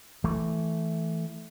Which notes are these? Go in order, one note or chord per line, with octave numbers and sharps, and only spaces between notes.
E3 A3